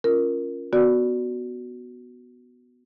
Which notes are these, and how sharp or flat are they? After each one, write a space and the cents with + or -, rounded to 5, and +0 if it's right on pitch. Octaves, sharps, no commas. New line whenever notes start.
C#4 +0 F4 +0 A#4 +0
B3 +0 F#4 +0 D5 +0